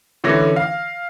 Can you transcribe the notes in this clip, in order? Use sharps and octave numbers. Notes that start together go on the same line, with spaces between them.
D3 E3 A3 C#4 A#6
F5